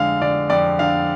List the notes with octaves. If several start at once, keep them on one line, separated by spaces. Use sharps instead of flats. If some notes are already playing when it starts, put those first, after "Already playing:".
Already playing: F2 D3 G#3 F5
D3 D5
F2 D5
D3 F5